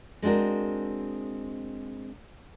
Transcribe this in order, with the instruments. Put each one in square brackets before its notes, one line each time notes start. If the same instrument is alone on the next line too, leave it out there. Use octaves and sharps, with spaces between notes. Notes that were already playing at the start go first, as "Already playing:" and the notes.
[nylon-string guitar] G#3 C4 D4 F#4 A#4